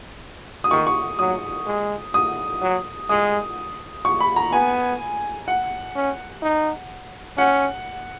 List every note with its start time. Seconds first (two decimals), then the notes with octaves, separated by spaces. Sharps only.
0.64 D#6
0.71 D#3 C#6
0.87 C#6
1.19 F#3 D#6
1.66 G#3
2.14 D#6
2.62 F#3
3.09 G#3 D#6
4.05 C#6
4.20 B5
4.36 A#5
4.52 B3 G#5
5.48 F#5
5.96 C#4
6.42 D#4
7.38 C#4 F#5